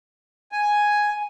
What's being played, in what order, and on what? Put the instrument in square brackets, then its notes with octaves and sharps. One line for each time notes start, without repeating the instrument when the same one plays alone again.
[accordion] G#5